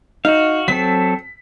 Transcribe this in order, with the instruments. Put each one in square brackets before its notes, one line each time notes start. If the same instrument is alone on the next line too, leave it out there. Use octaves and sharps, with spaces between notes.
[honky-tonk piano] D#4 [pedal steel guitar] F#4 F5
[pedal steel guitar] F#3 C4 A4 [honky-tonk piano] B6